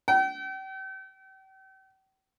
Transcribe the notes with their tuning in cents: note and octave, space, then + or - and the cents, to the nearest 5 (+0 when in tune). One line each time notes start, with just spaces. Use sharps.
G5 -40